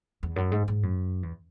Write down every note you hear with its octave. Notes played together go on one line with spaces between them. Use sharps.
E2
F#2
G#2
G#2
F#2
E2